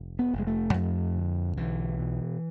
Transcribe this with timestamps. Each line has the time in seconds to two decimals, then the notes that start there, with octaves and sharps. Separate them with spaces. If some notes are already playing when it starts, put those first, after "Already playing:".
Already playing: F1
0.19 B3
0.33 F1
0.39 G#3
0.47 A3
0.74 F2 A3
1.16 D3
1.57 B1 E3
1.99 B2